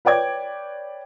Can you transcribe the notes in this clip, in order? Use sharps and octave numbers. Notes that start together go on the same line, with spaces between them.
B4 C#5 D5 G5 D6 G#6